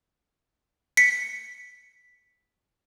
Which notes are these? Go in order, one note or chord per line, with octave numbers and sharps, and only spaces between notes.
B6 C#7